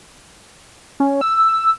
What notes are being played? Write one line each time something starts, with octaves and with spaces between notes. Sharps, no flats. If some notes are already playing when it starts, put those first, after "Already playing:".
C#4
E6